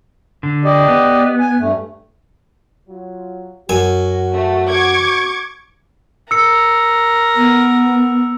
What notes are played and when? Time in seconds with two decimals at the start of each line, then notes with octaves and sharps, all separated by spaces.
0.43 D3
0.65 G4 D5 D#5
0.88 B3
1.40 G#5
1.59 G2 A3
2.88 F#3 F4
3.69 F#2 F#4 G#5
4.33 A3
4.70 C#6 D6 G#6
6.31 A#4 E6 C#7
7.36 B3